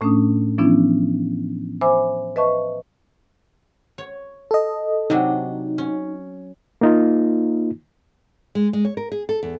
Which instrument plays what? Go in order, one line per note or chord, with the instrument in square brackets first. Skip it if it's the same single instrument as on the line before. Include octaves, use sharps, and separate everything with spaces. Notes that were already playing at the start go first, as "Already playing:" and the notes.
[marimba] A2 A3 C#4 D4 D#6
E3 F3 B3 C#4 D4 E4
C5 E5 G#5 B5 D6 E6
B4 D#5 E5 A5 C#6
[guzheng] C#5
[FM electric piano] A4 D#5
[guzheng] C3 F#3 D4 [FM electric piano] D#4
[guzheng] C#4
[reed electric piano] A#3 D#4 F4
[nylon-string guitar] G#3
G#3
C#5
A#4
G#4
A4
E2